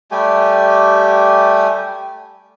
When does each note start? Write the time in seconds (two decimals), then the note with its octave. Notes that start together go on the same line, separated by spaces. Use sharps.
0.11 G3 A3 G4 G#5